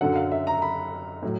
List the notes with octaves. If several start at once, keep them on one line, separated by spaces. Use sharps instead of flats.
F#2 D3 F#3 F#5
F5
E5
A#5
B5
A2 F#3